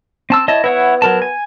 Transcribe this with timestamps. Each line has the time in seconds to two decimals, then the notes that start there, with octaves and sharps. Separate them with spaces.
0.30 C4 A5 E6
0.48 E4 C#5 D#5 A5
0.64 B3 E4 C#5 F#5
1.02 F#3 A#4 A5
1.22 G#5